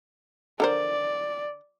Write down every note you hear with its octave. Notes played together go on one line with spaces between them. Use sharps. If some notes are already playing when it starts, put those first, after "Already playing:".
D3 A#4 C5 D5